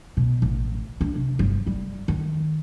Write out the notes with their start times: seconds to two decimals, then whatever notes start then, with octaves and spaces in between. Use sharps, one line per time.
0.17 B2
0.42 A1
1.01 D4
1.15 C3
1.39 G1
1.67 G3
2.08 D#3